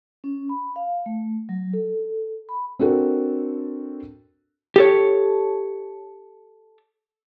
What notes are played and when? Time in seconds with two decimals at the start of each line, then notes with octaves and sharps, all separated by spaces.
0.24 C#4
0.49 B5
0.76 F5
1.06 A3
1.49 F#3
1.73 A4
2.49 B5
2.79 C4 D4 F#4 A4 A#4
4.76 G4 A4 C#5